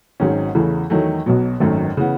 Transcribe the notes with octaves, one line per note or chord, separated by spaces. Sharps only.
G#1 G#2 D#3 F#3 C#4
E2 C#3 E3 A3
E2 D#3 F#3 A3
B1 B2 F#3
G#1 F#2 D#3 A3
C#3 E3 B3